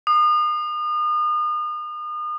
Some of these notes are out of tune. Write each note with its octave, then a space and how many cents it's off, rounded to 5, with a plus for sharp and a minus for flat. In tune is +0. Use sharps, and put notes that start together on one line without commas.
D#6 -35